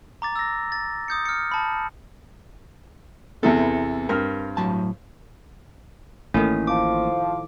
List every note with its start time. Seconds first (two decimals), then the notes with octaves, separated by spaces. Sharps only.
0.22 A#5 D6 A6
0.36 E6 A#6
0.72 A6
1.08 D#6 G6 C#7
1.26 F6 C#7
1.52 A5 B5
3.43 E2 C3 B3 E4 A4
4.09 G2 C4 A#4 F6
4.57 A2 F#3 A5
6.34 A1 A2 D#3 A#3 C#4
6.67 F3 D6